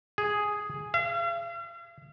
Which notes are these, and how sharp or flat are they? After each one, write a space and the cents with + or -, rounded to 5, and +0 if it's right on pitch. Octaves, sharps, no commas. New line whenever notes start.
G#4 +0
F5 -45